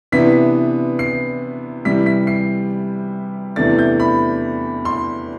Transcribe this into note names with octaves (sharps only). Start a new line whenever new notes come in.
C3 E3 B3 D4 B6
C7
C3 E3 G3 B6
B6
C7
E2 C3 E3 A3 D4 A6
G6
B5
C6